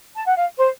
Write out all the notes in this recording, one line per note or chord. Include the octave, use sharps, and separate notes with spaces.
A5
F#5
F5
C5